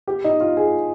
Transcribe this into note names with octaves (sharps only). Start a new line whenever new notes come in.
G4
D#4
F4
G#4